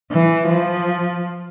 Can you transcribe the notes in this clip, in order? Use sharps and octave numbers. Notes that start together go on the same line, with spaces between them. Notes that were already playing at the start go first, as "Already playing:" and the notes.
E3
F3